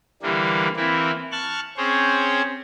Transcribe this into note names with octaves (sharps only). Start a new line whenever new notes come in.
D3 E3 G3 A#3 D4
E3 A#3 C4 E4
A5 C#6 F6 F#6
C4 C#4 G#4 C5 C#5